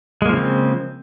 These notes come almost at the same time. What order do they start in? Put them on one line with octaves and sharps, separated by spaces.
G#3 A#3 F3 C#3 C4